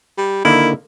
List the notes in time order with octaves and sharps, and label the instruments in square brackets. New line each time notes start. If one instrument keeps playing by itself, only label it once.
[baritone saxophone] G3
[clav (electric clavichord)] D3 D#3 A#3 [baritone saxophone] E4